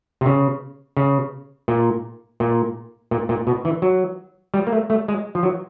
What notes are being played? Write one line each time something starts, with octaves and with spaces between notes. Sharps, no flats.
C3
C#3
C#3
A#2
A#2
A#2
A#2
B2
E3
F#3
G3
A#3
A3
A3
G#3
F3
F#3